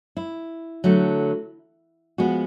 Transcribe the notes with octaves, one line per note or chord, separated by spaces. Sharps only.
E4
D3 F#3 A3
F3 G#3 B3 F#4